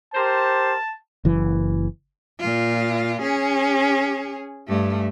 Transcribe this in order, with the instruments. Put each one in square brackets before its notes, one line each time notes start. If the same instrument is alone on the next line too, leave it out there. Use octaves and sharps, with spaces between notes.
[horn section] G4 A#4 C5 [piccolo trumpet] A5
[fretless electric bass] F#1 E3
[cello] A#2 F4
C#4 G#4
G2 A3